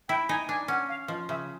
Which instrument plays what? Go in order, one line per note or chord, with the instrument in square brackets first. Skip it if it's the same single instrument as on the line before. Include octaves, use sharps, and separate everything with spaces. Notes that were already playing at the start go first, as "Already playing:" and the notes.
[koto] E4 [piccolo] G5
[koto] D#4 [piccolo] G#5
[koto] D4 [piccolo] G#5
[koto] C#4 [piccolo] F#5
[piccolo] F5
[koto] F3 [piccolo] D#5
[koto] C#3 [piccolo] E5